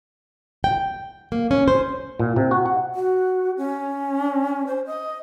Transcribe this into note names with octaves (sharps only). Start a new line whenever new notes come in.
G5
A#3
C#4
C5
A#2
C3
F#4
F#5
F#4
C#4
C5
D#5